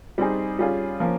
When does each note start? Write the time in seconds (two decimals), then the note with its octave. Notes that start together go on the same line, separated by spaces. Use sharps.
0.18 G3 C4 D#4 G#4
0.59 G3 C#4 F4 G#4
1.00 F3 A#3 C#4